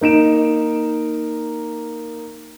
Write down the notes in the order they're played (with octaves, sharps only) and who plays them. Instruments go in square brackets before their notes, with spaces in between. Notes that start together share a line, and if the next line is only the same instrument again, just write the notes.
[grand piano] A#3 D#4 D7 E7